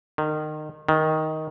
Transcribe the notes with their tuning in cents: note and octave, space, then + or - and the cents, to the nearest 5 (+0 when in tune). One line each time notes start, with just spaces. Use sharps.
D#3 -25
D#3 +10